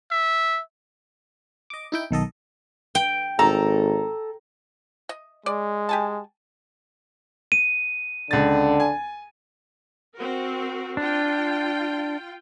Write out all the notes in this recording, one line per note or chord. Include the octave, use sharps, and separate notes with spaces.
E5
D#5 D6
D#4 E4 G5
B1 D#3 A4 D#5
G5
G#1 A4 A#5
D#5
G#3 D5
G4 G#5 A5
D#7
C#2 D3 A6
G#5
C4 F#4 A#4
D4 F4 G5